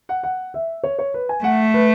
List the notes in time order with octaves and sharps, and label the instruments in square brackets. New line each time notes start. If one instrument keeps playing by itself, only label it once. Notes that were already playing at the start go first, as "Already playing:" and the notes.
[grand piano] F#5
F#5
E5
C#5
C#5
B4
G#5
[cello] A3 [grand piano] F#5
[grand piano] B4